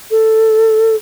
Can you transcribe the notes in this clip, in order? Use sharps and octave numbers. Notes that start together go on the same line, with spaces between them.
A4